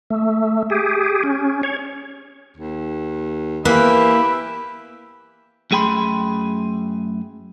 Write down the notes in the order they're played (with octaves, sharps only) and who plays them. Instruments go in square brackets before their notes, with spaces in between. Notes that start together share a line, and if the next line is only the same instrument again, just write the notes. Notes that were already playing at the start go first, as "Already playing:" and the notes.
[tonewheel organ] A3
G4 G#4
C#4
C#5
[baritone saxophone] D#2
[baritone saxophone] E3 [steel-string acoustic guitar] A#3 [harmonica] G4 E5 B5 [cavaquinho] B4
[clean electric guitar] F#2 A3 G#4 G5 B5 C6